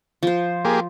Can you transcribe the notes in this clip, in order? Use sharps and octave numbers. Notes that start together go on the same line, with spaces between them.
F3 C5
A#3 G4 G#4